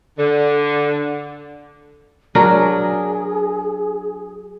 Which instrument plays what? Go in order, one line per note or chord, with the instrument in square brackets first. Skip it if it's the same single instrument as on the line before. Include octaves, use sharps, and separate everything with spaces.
[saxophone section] D3
[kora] F#3 D4 A#4 [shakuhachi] G#4